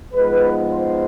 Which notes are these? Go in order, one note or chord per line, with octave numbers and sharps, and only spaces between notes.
G#2 F3 G#3 B3 B4
C5